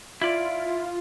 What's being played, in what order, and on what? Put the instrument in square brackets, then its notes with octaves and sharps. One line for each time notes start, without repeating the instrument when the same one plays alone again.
[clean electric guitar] E4 D5 [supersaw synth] F4